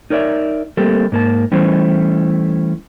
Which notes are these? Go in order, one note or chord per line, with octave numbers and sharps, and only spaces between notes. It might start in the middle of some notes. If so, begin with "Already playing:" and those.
D#4 A#4 C#5 D5 E5
G3 A3 A#3 C4 G4 A4
G#2 A#3 A5
E3 G3 A3 C#4 E4 C5